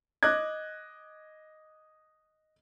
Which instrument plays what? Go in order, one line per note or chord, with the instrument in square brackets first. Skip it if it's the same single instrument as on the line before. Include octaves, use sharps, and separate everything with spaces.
[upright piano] D#5 D6 F#6 G#6